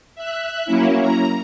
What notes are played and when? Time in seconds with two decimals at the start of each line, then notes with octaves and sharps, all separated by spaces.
0.15 E5 F#6
0.65 F#3 A#3 C#4 E4
1.00 A#5